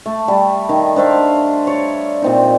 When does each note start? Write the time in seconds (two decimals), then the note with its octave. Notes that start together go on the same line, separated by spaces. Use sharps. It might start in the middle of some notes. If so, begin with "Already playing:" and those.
0.06 A3
0.28 G3
0.69 D#3
0.96 D4 C5 E5 F5
1.67 C#5 D5
2.22 A#2 C4 D#4